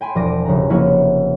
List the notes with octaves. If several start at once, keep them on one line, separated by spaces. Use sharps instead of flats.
G5 G#5 B5 C6
E1 F3 D5 D6 A#6 D#7
F1 C#3 F#5 A#5
F1 A#3 E4 C#5 F#5 G#5